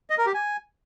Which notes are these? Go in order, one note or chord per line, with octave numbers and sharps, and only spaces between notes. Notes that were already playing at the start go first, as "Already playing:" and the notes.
D#5
A#4
G4
G#5